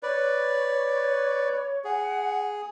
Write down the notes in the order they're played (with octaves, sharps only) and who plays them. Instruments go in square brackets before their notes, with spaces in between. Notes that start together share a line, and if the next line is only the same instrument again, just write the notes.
[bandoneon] B4 D5 [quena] C#5
[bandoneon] G#4 [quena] F#5